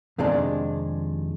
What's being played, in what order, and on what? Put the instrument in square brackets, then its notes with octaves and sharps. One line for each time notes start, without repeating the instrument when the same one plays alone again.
[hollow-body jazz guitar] F2 C3 D#3 G#3 D4